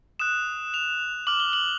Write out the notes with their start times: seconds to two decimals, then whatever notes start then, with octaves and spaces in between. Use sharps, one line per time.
0.19 D#6 F#6 E7
0.74 F7
1.27 D6 F6 F#7
1.40 G7
1.53 F#7